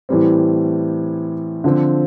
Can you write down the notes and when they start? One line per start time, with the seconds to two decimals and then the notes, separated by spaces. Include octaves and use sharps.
0.09 A2 E3 G3 C4
1.64 D3 F3 C4